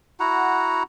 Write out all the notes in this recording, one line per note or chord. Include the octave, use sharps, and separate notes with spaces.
E4 F#4 F#5 A#5